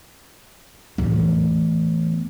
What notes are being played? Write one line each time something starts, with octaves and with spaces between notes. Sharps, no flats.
E2 A2